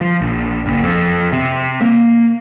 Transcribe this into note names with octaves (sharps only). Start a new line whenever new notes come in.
F3
A#1
F#1
F2
C3
A#3